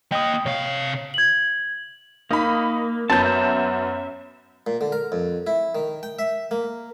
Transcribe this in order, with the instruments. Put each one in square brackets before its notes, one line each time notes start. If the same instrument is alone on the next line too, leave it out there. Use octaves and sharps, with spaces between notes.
[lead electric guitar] A#3 D#5 [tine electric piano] G5 D#6
[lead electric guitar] C3 F5 [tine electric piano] C#5
[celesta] G#6 F#7
[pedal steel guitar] A#3 [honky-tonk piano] D#4 B5
[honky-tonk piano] F#2 B3 G6 [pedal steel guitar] A5
[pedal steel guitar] E5
[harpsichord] A#2
D3
A#4
F2
E4
D#3
G5
E5
A#3